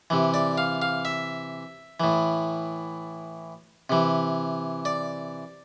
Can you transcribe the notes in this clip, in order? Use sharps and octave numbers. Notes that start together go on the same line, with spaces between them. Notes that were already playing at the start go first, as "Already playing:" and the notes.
C3 E3
D5
F5
F5
E5
A2 E3
C3 E3
D5